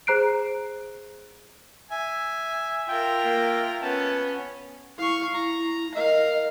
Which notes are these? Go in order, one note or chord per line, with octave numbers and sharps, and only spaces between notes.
G#4 C5 A#5 F#6 C7 D7
E5 G#5
F4 A#4 G5
A#3
B3 C#4 A5
E4 F5 C#6
E4 A#5
A#4 D#5 F5